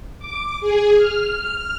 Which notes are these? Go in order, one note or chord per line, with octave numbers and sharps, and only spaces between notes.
D6
G#4
F6